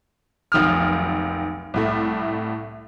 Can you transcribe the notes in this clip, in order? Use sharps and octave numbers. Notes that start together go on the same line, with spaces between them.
F1 B1 D#3 D#6 F6
C2 A2 A3